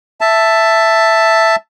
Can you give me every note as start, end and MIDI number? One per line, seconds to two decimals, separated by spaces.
0.21 1.56 76
0.21 1.56 81